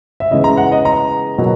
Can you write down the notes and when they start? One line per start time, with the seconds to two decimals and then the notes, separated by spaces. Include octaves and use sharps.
0.20 E5
0.31 C#3 E3 G#3 B3 D#5
0.44 A#5
0.57 F#5
0.72 D#5
0.85 A#5
1.38 B2 F#3 A#3